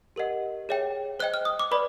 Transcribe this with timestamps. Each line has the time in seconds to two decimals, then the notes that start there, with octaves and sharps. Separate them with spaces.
0.16 G4 A#4 D#5 F#5
0.69 G#4 C#5 E5 G5
1.20 C5 D#5 G5 F#6
1.34 F6
1.45 D#6
1.59 D6
1.71 B4 D5 B5